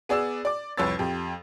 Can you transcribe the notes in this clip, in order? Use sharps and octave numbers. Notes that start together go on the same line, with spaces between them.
B3 G#4 D5 E6 E7
D5 D6
C2 F2 B4 C#5 E6 A6
F2 G4